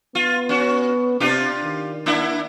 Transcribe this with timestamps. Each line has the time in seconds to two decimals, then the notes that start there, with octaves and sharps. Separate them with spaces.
0.15 B3 F4
0.49 C#4 F#4
1.20 C3 D4 F4 G4
1.64 D#3
2.06 A#3 D4 E4